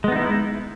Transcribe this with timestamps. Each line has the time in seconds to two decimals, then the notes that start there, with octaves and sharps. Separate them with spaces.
0.04 G#3
0.08 B3
0.12 D#4
0.16 E4